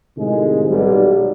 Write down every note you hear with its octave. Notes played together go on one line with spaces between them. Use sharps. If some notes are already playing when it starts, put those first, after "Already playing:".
A2 C3 D#3 F3 G#3
B1 G3